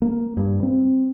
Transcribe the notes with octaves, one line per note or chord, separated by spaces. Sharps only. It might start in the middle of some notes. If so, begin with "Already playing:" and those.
A#3
G2
C4